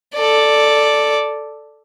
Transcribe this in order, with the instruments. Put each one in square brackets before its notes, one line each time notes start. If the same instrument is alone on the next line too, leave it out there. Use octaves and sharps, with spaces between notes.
[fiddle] A4 D5